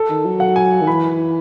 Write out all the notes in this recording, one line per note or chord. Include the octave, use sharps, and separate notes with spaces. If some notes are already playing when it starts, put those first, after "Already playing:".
Already playing: A4
D#3
F#3
F#5
G#5
D#3
E3 B5